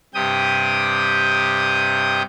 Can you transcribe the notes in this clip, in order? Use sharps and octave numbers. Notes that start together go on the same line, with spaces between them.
G2 C3 G4 G5 D#6